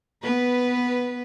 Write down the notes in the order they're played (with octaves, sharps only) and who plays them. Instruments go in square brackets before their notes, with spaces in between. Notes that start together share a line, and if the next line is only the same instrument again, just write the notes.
[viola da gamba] B3 B4